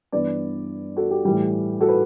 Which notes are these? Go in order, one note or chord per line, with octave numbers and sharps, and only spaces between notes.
G2 E3 B3 B4 D5
F#4 A4
G4
A2 E3 G3
F#4 A4
B4